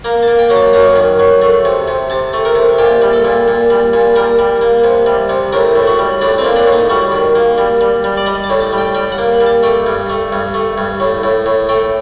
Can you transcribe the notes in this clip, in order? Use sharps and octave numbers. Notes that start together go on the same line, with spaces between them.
A#3 A#5
A5
A#3
G5
F#3 A#5
A5
F#2 A#5
D#3
F#3
A3
C3
C3
C3 A5
A3
A#4
C3
A#2 G4
G3
A4
A#2
A#2
G3
A#2
G3 A#4
G3
A#3
C3
G3
C3
A2 A#4
A2
F#4
G3
A2 D4
C4
A#3
D4
A2
D#4
G3 F#4
D#3
A#3
G3
G3
G3
D5
G3 D#5
A5
A2
A5
G3
G5
G3 G5
F#5
A#3
G3
A5
A3 G5
G2
A3
G2
A3
G2
A2
A2
A2
A3 G5